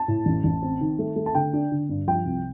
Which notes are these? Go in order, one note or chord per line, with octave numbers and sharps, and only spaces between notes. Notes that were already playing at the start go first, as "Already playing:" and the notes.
Already playing: A5
A2
A1
A1
C4
D#3
A3
A3
A5
D3 G5
D4
D3
G2
F3 G5
C2